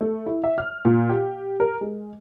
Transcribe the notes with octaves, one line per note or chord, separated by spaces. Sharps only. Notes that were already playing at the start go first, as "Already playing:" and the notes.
A3
E4
E5
F6
A#2
G4
A#4
G#3